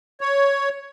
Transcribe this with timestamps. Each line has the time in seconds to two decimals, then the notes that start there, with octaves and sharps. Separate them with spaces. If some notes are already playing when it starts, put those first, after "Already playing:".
0.21 C#5